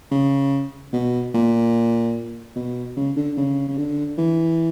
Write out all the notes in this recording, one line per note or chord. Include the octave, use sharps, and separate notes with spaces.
C#3
B2
A#2
B2
C#3
D3
C#3
C#3
D3
E3